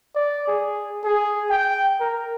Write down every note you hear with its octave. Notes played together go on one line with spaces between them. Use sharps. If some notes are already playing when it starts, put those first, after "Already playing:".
D5
G#4
G#4
G5
A#4